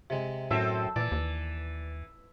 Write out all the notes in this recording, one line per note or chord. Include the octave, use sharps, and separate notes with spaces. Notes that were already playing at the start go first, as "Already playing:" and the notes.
C3 G#3
F#2 A2 C4 A4 E5
A#2 E3 D5
D#2